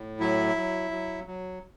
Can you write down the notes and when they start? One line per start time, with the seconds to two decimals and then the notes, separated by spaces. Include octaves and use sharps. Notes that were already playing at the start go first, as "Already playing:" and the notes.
Already playing: A2
0.20 F#3 E4 E5
0.56 F#3
0.91 F#3
1.27 F#3